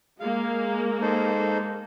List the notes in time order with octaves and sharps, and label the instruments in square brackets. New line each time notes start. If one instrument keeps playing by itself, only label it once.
[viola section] G#3 A#3 [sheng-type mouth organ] F5
[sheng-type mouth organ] D#4 A4 C5